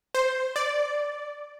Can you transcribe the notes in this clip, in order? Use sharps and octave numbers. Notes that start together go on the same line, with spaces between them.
C5
D5